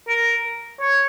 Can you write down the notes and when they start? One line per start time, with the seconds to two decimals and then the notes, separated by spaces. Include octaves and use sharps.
0.09 A#4
0.81 C#5